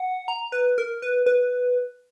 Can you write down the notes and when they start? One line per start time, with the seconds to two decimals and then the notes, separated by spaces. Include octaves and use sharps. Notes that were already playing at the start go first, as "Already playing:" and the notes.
Already playing: F#5
0.28 A#5
0.52 B4
0.78 A#4
1.02 B4
1.26 B4